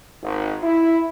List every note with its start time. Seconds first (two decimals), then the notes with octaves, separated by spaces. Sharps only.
0.22 G#1
0.63 E4